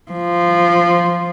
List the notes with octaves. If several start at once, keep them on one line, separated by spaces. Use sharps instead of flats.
F3